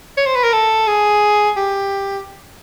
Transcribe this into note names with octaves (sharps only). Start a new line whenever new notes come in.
C#5
C5
B4
A#4
A4
G#4
G4